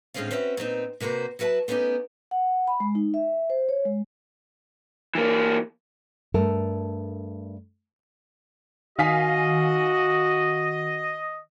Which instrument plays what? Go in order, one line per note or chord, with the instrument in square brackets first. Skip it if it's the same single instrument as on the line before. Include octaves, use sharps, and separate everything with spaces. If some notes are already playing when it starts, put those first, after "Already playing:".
[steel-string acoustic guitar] A2 D3 G#3 C4 C#4 F4
C4 C#4 F#4 B4 D5 E5
A#2 B3 C4 D#4
C3 A#3 F#4 B4 C5
F#3 F#4 B4 E5 A5
A3 B3 C#4 D#4 G4
[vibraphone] F#5
B5
G#3
D#4
E5
C5
C#5
G#3
[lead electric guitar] E3 A#3
[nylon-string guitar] G2 A3 A4 A#4
[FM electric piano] D#3 [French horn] F#4 [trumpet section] D#5 [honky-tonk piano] F5 G#5 B6